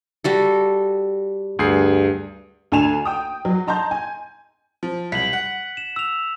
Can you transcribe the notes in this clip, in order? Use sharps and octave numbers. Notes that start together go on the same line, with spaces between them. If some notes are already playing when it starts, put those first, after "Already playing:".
G3 F#4 A4
D2 G2 G#4 C7
D2 D4 G#5 E7 F7
G5 D#6
F#3
D#5 A5 A#5 C6 G6
G#5
F3
C2 B6 F#7
F#5
E7
E6 F7